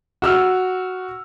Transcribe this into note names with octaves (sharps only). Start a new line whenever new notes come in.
F#4 E6 F6